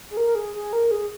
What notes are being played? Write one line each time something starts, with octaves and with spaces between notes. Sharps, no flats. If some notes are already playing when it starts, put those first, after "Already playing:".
G#4
A#4
G#4
G#4
A#4
G#4